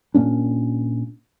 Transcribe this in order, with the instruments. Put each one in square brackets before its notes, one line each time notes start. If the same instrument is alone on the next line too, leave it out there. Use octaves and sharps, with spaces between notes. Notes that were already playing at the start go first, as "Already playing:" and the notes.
[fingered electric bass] A#2 A#3 C#4 D4